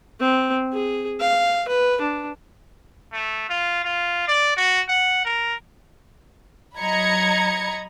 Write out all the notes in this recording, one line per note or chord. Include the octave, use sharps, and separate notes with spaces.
C4
G#4
F5
B4
D4
A3
F4
F4
D5
F#4
F#5
A#4
F#3 D#5 A#5 B5 G#6 C#7